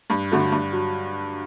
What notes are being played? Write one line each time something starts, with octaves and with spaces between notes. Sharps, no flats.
G2
D3 F#3 A3
G2
F#3